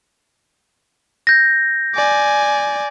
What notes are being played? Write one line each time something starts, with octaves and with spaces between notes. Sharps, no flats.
G6 A#6
D5 G#5